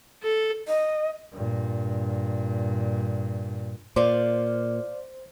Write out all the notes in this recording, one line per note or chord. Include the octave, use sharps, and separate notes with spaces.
A4
D#5
G2 A#2
A#2 C5 D5 F5